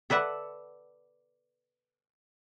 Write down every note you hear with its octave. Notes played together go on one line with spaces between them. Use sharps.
A4 B4 D5 E5 F#5